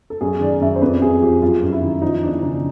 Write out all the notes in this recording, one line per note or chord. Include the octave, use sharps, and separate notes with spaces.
A4
F#2 G#4
D#3 D5
F#2 E5
C5
F2 B4
F2 G#4
F3 G4
F#2 F4
F#2
E4
D#3
F3 D#4
E2 D4
C#3 D#4